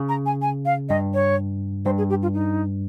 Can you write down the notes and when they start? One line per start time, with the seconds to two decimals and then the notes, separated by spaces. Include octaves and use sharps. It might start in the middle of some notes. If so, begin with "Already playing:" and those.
Already playing: C#3
0.09 A#5
0.26 G#5
0.42 G#5
0.66 F5
0.89 G2 D#5
1.14 C#5
1.85 G2 C5
1.98 G#4
2.10 G4
2.22 F4
2.34 D#4